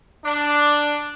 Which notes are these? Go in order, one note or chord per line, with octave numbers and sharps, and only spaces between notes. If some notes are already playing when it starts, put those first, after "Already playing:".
D4